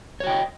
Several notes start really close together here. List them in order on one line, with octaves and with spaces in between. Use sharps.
C#5 F#4 G5 D#5